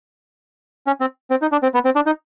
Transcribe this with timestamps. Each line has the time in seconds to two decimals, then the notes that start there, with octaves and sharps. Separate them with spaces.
0.87 C#4
1.01 C4
1.30 C4
1.42 D#4
1.52 D4
1.63 C4
1.74 B3
1.85 C4
1.96 D4
2.06 D#4